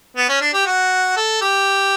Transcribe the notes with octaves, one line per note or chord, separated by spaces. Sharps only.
B3
C#4
D4
G4
F#4
A4
G4